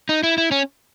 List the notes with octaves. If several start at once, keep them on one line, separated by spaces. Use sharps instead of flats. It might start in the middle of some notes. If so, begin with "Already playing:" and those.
D#4
E4
E4
C#4